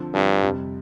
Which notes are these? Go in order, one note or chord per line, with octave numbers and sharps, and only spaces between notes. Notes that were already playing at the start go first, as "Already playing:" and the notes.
Already playing: D3 F3 C4
G2 D3 F3 C4
F2 C3 G3